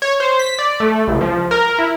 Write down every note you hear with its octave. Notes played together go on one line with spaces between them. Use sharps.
C#5
C5
B6
D5
A3
C#2
F3
A#4
E4